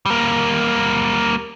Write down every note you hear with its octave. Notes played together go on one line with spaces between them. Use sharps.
G3 A#3